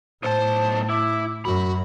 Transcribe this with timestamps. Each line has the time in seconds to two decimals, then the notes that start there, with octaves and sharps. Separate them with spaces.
0.23 B1 A2 C5 A5
0.89 E4 D6
1.45 F#2 F#4 B5